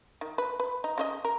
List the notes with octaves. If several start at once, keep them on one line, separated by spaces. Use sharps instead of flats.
D#3
B4
B4
D#4
C#3 F4 D#5
A#4